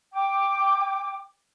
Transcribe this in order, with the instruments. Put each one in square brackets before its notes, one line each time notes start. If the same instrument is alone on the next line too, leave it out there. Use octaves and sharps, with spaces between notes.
[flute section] G5 D6